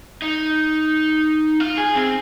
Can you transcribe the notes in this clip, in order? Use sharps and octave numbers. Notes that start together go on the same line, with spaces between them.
D#4
F4
G#4
C4